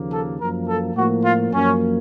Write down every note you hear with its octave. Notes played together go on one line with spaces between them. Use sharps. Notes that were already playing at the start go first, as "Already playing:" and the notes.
Already playing: D#2 C#3 F3 A#3
A4
F#2 F3 A#3 A#4
A4
A2 F3 A#3 F#4
F4
F#2 F3 A#3 C#4